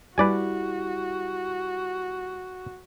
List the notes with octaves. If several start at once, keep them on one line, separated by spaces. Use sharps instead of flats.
G3 E4 F#4 B4 D5 G#5